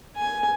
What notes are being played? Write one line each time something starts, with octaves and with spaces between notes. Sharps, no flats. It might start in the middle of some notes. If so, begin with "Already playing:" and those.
G#5